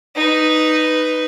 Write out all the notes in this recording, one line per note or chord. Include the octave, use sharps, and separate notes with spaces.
D#4 B4